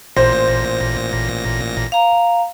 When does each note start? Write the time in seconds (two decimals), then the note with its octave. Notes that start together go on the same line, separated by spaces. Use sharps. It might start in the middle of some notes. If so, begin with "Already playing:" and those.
0.16 A1 A#2 C5 A#6
1.92 F5 A#5